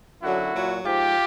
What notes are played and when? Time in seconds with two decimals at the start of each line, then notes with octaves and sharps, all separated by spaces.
0.23 F#2 D3 F#3 E4 F#4
0.53 A#2 F#3
0.84 G#2 F3 F4 G4